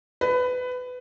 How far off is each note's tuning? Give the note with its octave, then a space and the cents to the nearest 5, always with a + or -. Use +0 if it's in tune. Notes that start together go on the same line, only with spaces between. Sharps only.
B4 +20